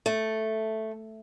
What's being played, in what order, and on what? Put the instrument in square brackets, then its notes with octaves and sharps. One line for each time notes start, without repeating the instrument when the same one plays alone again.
[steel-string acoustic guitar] A3